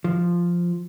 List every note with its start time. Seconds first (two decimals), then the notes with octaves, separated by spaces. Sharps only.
0.04 F3